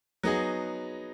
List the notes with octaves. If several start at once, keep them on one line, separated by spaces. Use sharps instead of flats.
F#3 B3 D#4 G#4